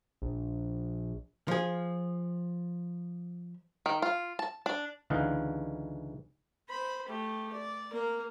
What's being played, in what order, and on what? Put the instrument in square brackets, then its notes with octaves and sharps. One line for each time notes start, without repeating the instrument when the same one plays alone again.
[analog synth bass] A#1
[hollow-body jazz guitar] F3 G#4
[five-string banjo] D#3
F4
A5
D4
[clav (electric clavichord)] C#2 D3 E3 D#4 F5 F#5
[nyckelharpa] C5 B5
A3 G4
D5
A#3 A#4